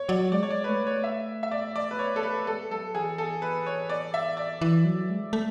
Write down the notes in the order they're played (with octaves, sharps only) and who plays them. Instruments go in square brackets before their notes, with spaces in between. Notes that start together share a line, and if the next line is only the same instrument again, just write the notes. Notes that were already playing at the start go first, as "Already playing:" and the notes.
Already playing: [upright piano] C#5
[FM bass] F#3 [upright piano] D5
[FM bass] G#3 [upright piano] D5
[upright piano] C#5
D5
B4
[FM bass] A3 [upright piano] C#5
[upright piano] C#5
E5
E5
D5
D5
B4
C#5
A4
B4
[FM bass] G#3 [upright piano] A4
[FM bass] F#3 [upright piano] A4
[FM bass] E3 [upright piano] G#4
[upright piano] A4
B4
C#5
D5
E5
D5
[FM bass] E3
F#3
G#3
A3